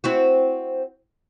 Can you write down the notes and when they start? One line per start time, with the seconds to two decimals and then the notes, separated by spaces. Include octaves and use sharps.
0.04 C4 E4 F#4